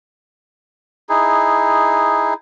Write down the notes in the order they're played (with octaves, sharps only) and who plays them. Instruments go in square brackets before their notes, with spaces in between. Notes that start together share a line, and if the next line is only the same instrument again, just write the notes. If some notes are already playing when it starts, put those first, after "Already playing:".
[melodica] D#4 E4 G#4